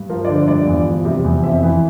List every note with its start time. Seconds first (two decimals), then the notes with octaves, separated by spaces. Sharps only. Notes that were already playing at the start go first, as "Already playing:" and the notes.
Already playing: G2
0.10 F3 A#4
0.25 D5
0.28 D3 C5
0.48 G2 D5
0.67 E2
0.86 F3
1.05 C3
1.24 E2
1.43 F2 E5
1.62 E3